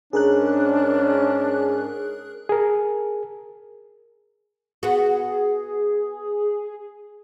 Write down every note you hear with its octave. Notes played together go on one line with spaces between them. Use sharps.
G#2 C#4 D4 G#4 A#4 F#6
G#4 A#4
B3 F#4 G#4